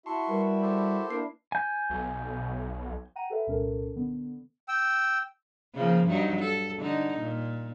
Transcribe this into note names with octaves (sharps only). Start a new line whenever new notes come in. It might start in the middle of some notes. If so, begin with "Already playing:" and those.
E4 F#4 E5 A5 C6 C#6
G3 A#4 B4
G4 A4 C5
A#3 D4 E4 C7
G#5 G6
B1
F#5 G5 A#5 D#7
G4 A4 B4 E5
C2 A#2 C#4 A4 A#4
D3 B3
G5 E6
C#3 F3 A#3
G2 F#3 D#4
A4
D3 D#4
A#2